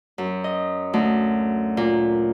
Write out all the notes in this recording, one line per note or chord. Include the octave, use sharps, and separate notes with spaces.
F#2
D#5
D2
A#2